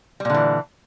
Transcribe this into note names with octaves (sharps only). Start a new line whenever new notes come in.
A#2 D3 E3 G3